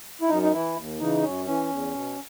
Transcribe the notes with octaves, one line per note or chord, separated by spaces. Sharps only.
E4
F#2 D#4
D#4
E3 E4
D#2
C#3 E3 D#4
F#2 C#4
E3 C#4
E2
B2